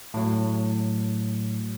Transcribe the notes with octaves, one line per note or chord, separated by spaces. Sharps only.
A2 F#3